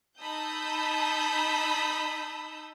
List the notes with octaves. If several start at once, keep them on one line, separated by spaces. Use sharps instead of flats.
D#4 A5 B5 D#6 E6 G6